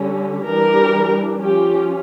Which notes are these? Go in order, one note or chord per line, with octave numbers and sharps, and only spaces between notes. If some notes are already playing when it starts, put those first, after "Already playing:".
Already playing: D3 G3 C#4
E3 G3 D4 G4 A#4
F3 C#4 F4 G4